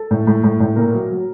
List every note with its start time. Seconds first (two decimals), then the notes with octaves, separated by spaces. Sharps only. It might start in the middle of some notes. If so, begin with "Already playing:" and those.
Already playing: A4
0.11 A2
0.27 A2
0.43 A2
0.60 A2
0.76 A#2 A#4
0.93 F#3
1.10 F#3